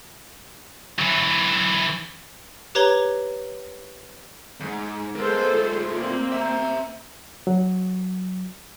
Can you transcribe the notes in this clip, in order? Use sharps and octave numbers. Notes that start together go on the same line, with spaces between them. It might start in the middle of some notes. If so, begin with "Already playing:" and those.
E3 F#3
G4 B4 C#5 A#5 G#6 G7
E2 G#2
G#3 B3 A4 A#4 C5
A2 F4
A#3 C4
E5 A#5
F#3